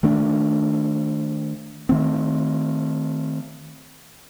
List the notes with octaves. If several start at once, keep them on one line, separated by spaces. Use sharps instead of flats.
D#3 A3 D4
D#3 A3 C4